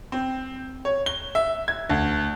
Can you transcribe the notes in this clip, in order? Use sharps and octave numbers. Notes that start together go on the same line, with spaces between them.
C4
C#5
G7
E5
G#6
D2